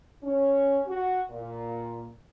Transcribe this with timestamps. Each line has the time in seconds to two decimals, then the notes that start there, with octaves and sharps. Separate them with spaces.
0.23 C#4
0.86 F#4
1.30 A#2